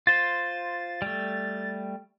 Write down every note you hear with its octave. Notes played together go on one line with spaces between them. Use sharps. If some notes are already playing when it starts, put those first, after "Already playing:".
F4 C5 A6
G3 A3